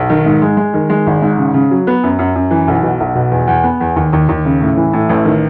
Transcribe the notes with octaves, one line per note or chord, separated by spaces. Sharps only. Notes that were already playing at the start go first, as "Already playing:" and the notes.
Already playing: B1
D#3
G#2
G#3
G#3
D#3
G#3
G#1
G#2
C#3
C#3
F#3
B3
F#2
F#2
F#2
E3
B1
B2
B1
B2
E2
E2
B3
E2
D#2
D#2
D#2
C#3
A2
E3
A2
A1
D#3